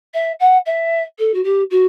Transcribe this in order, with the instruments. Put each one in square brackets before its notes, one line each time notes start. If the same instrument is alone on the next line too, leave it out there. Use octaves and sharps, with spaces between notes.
[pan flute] E5
F#5
E5
A4
F#4
G4
F#4